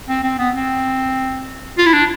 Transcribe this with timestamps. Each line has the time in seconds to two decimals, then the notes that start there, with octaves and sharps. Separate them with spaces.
0.09 C4
0.24 C4
0.39 B3
0.55 C4
1.78 F4
1.86 E4
1.93 D4